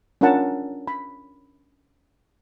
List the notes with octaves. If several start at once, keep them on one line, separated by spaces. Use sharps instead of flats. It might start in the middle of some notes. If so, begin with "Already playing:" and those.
C#4 D4 F4 A#4 F#5 A5
B5